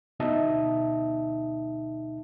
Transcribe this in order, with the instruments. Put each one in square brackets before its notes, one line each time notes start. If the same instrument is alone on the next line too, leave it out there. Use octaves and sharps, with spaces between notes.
[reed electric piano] D2 B2 D#4 D#5 E5 A5